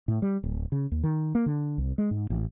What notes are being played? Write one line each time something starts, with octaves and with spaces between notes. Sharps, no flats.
A2
G3
D1
C#3
D#2
D#3
A#3
D3
C2
G#3
G#2
A1